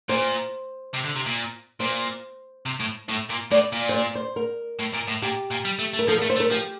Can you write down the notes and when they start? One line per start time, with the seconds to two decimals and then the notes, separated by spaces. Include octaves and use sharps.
0.09 A#2 C5
0.94 C3
1.05 D3
1.16 C3
1.26 A#2
1.80 A#2 C5
2.66 C3
2.80 A2
3.09 A2
3.30 A#2
3.51 A2 D5
3.73 A#2
3.89 C5
3.94 D5
4.15 C5
4.36 A#4
4.80 A2
4.94 A#2
5.08 A2
5.22 A#2 G4
5.51 A#2
5.65 G3
5.79 A3
5.93 A3
5.99 A#4
6.08 F3 A4
6.18 A3 A#4
6.30 C5
6.36 A3
6.40 A#4
6.51 F3 G4